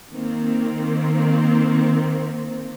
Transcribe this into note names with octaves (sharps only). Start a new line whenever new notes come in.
D#3 A#3 C4